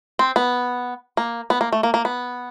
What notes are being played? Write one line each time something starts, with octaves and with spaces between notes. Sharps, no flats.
C4
B3
A#3
B3
A#3
A3
A#3
A#3
B3